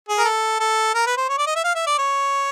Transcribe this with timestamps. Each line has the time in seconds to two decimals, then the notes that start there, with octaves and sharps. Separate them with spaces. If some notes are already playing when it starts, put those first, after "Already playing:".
0.09 G#4
0.18 A#4
0.25 A4
0.60 A4
0.95 A#4
1.07 B4
1.17 C5
1.29 C#5
1.38 D5
1.47 D#5
1.56 E5
1.64 F5
1.75 E5
1.87 D5
1.99 C#5